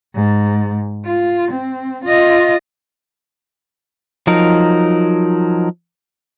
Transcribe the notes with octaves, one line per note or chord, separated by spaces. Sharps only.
G#2
F4
C4
F4 D#5
F3 F#3 D#4 A#4